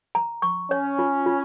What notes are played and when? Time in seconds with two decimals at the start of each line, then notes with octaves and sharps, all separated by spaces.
0.15 A#5
0.42 C#6
0.71 C#4 C#5
0.99 F4
1.26 F4